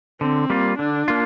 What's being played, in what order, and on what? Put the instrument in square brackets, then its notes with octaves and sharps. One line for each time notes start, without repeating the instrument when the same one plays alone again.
[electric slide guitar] D3 [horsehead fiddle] C4
[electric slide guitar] G3 A#3 F4
[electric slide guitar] D3 [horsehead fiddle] D4
[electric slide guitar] A#3 F4